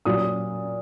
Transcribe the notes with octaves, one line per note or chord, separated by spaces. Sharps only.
A#2 F#3 D#6